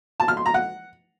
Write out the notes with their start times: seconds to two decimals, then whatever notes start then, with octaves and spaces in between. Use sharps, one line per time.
0.20 A5
0.28 F6
0.37 C6
0.46 A#5
0.54 F#5